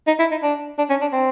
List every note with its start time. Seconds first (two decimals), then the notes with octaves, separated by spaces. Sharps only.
0.07 D#4
0.19 E4
0.31 D#4
0.43 D4
0.78 D4
0.90 C#4
1.01 D4
1.13 C4